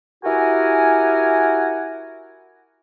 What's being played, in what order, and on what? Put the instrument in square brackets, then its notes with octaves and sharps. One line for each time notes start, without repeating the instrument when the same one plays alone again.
[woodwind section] E4 F#4 G4 A#4 F#5 G#5